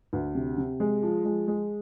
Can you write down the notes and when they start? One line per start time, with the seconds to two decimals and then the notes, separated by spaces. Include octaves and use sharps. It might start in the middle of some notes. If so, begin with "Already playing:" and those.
0.13 D2
0.35 C3
0.58 C3
0.80 G#3
1.03 F3
1.25 G#3
1.48 G#3